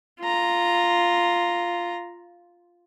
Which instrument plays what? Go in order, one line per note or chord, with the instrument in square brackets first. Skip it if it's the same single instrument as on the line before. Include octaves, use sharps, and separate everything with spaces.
[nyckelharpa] F4 A#5